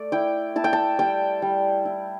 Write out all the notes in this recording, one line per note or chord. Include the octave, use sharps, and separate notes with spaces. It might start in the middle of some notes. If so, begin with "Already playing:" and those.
Already playing: A3 D5
E4 G5
E4 A5
G5
A5
G3 G5
G3
E4